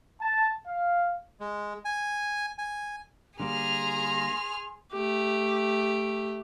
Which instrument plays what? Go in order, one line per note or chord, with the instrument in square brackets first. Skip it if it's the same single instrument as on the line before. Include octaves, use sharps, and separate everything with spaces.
[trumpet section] A5
F5
[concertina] G#3
G#5
G#5
[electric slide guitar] D3 G3 A#3 [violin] G#4 F6 [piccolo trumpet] A#5 [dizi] C6
[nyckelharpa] A3 G4